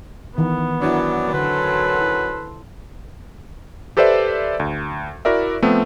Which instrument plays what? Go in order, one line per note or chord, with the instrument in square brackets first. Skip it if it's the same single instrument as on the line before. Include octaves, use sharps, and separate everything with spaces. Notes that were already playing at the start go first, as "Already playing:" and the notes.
[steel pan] D#3 E3 [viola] B3
[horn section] F#2 D#3 F#3 [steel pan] D4 E4 [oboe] D5
[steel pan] D3 [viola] A4 C5 [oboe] B4
[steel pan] E4
[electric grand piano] G4 A4 B4 C5 D5 E5
D2
E4 F#4 A#4 D5 E5
F3 A3 B3 C4